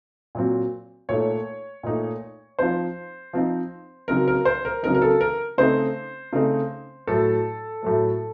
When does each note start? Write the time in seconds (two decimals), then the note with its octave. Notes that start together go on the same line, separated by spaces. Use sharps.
0.35 A#2 F#3 C4
1.09 A#2 A3 D#4 C#5
1.83 A#2 A3 D#4
2.59 F3 C4 D#4 C5
3.33 F3 C4 D#4
4.08 C#3 F#3 C4 D#4 A#4
4.28 A#4
4.45 C5
4.65 A#4
4.83 C#3 F#3 C4 D#4 A#4
4.95 A#4
5.02 A4
5.21 A#4
5.58 C#3 A3 C4 D#4 C5
6.33 C#3 A3 C4 D#4
7.07 A2 F#3 A3 A4
7.83 A2 F#3 A3